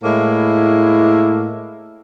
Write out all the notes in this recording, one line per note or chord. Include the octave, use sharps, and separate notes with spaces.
A2 G#3 A#3 E4